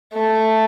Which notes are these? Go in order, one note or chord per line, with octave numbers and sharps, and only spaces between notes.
A3